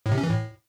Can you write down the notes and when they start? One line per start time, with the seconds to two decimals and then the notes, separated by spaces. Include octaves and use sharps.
0.06 A2
0.12 C3
0.18 C#4
0.23 E3
0.29 A2